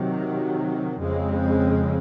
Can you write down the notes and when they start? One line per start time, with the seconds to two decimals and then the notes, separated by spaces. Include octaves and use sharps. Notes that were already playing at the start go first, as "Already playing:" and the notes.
Already playing: C3 D#3 F#3
1.00 F2 C#3 G#3 C4